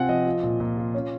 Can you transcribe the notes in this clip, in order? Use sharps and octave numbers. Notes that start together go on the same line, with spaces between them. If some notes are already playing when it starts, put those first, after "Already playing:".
Already playing: C3 C4 F4 F#5 G#5
F3 D#5
F4
A#2
A#2
F4
C#4